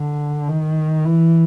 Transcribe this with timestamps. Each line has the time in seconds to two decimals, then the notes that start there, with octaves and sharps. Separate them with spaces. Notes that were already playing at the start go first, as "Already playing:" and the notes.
Already playing: D3
0.48 D#3
1.05 E3